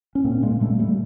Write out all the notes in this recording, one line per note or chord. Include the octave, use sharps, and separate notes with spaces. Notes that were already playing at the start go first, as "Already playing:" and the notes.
C#4
A#2 A#3 C4
A#2 G#3 A#3
A#2 G3 A3
A#2 G3 A3